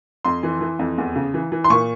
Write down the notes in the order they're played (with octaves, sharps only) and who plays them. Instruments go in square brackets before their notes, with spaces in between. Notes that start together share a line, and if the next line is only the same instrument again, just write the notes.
[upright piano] F2 C6
E3
E3
F2
E2
C#3
E3
E3
C6
A#2 C#6